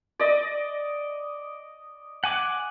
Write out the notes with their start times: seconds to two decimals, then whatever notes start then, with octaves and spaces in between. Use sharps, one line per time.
0.19 D5 D#5
2.24 F#5 G#5 D6